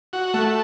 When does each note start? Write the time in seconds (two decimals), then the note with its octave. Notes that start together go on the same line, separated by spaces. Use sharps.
0.13 F#4
0.34 A3